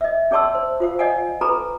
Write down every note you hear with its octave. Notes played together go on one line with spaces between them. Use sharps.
D#5 E5
C#4 G#4 D5 A5 C6 E6
C5
F4 C5 F5
D5 D#5 F5 F#5 G#5
G#4 A4 B4 A#5 B5